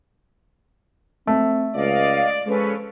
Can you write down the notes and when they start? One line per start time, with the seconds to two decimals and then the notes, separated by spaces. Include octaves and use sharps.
1.27 A3 C4
1.75 C#2 D5 D#5 F5
2.46 F3 G#3 C#4 A4 B4